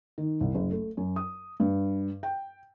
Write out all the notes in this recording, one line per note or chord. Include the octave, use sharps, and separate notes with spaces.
D#3
C2
F#1
A3
F#2
D#6
G2
G5